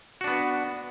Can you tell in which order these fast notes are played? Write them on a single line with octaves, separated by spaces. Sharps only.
F#4 D4 B3